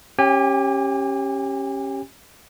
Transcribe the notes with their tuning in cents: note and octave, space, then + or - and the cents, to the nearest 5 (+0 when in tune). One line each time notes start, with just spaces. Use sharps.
C#4 -20 G4 +0 G#5 -35